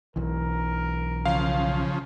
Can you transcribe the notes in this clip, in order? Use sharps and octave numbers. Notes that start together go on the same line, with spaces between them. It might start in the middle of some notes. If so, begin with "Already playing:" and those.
B1 E3 A#4
C#3 F3 F5